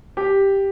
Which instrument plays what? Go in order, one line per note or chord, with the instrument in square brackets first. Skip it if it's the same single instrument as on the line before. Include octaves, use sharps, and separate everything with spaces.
[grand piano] G4